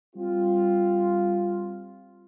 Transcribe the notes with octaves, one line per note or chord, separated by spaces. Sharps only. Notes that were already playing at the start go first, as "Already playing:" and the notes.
G3 C4 F4